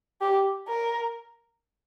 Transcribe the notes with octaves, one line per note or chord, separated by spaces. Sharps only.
G4
A#4